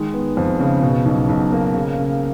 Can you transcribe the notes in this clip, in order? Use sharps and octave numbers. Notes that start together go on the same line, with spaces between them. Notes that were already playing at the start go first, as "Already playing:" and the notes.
Already playing: D#3 G#3
B3
F2
C#3
B2
B1
B1
A#3
C#3
C#3